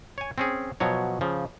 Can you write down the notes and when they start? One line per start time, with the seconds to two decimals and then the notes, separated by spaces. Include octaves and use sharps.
0.18 C#5 G#5
0.38 C4 C#4 G#4
0.80 B2 F3 F#3 C#5
1.21 C#3 F3